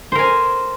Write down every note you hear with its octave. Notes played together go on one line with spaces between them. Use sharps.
A#4 C5 G#5